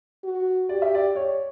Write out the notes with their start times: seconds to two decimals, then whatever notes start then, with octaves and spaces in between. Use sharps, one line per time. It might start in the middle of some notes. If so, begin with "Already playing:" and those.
0.24 F#4
0.69 G4 D5
0.82 E5
0.95 D5
1.16 C#5